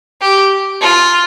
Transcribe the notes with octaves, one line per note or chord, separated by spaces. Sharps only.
G4
F4